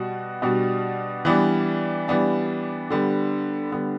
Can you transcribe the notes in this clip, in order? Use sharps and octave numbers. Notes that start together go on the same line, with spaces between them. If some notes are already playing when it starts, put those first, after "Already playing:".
Already playing: B2 G3 F#4
B2 G3 D4 F#4
E3 G3 B3 D4
E3 G3 B3 D4
D3 G3 B3
D3 G3 B3